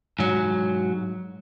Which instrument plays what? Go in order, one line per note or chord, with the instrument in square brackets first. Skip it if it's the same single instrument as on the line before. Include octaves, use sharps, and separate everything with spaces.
[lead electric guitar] G#2 F#3